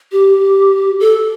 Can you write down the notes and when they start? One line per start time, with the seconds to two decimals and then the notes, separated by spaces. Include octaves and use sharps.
0.12 G4
1.00 A4